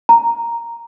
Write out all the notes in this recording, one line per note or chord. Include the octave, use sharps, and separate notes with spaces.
A#5